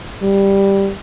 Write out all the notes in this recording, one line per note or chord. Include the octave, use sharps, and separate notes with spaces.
G3